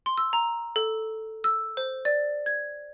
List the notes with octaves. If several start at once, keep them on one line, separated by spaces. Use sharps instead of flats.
C6
E6
A#5
A4
E6
C5
D5
G#6